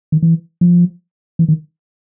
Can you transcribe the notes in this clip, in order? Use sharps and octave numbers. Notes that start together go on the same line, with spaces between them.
D#3
E3
F3
E3
D#3